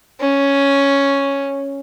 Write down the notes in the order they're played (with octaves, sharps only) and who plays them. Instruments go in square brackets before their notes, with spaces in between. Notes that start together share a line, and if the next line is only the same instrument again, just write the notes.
[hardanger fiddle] C#4